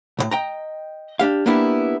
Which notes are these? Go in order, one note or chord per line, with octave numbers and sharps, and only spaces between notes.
B1 A2
D#5 G5 A#5
D4 G4 F5
A#3 B3 D4 E4 G4